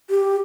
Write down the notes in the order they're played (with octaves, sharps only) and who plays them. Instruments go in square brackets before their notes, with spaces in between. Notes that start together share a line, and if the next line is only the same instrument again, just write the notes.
[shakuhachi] G4